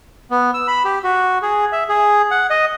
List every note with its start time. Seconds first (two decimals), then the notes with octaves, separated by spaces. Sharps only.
0.31 B3
0.54 E6
0.67 B5
0.85 G4
1.04 F#4
1.42 G#4
1.72 E5
1.89 G#4
2.31 F#5
2.50 D#5